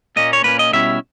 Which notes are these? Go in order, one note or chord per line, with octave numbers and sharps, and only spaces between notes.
A#2 A#3 C#4 D#5
C#5
A#2 A#3 C#4 B4
D#5
B2 G3 C#4 E4 E5